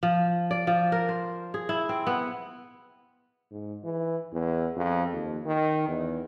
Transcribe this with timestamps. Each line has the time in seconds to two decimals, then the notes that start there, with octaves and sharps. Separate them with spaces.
0.03 F3
0.51 D5
0.67 F3
0.92 A#4
1.09 C5
1.54 G#4
1.69 E4
1.89 C4
2.07 B3
3.51 G#2
3.84 E3
4.33 E2
4.76 F2
5.12 D#2
5.46 D#3
5.88 E2